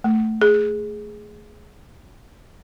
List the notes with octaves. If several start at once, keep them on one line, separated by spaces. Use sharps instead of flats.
A3
G#4